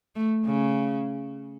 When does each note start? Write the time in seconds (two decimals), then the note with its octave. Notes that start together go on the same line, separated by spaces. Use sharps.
0.16 A3
0.45 C#3